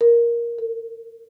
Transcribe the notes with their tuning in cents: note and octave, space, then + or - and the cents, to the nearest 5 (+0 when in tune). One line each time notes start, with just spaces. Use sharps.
A#4 +10
A#4 -40